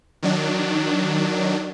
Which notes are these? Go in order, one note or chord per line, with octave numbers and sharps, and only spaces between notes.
D#3 F#3 D4